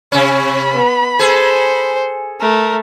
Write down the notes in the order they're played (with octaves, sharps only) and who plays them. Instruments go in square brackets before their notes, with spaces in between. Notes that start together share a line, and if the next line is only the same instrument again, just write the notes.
[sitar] C3 C#4 [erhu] B5
[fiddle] B3
[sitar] G#4 A4 [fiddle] C5
[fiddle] A3 [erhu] A#4